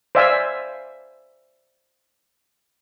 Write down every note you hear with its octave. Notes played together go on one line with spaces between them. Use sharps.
C5 D5 E5 F5 G#5